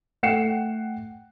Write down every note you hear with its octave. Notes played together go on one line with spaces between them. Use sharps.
A3 F#5 G5 C7 C#7 E7